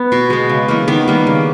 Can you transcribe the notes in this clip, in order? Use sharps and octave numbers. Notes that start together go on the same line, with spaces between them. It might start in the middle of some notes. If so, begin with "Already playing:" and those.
Already playing: B3
B2
G#3 B3
C#3
E3 A#3
D#3 B3
G3 A#3
C#3